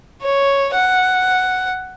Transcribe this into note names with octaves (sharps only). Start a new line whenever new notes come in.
C#5
F#5